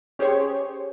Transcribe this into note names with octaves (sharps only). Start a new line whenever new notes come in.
C#4 G4 G#4 C5 C#5